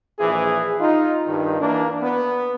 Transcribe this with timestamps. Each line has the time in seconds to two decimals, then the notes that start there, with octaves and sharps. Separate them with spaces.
0.19 A#1 E3 G#4
0.80 D#4 F4
1.27 G2 D#3
1.60 E3 A#3 D4
2.03 B3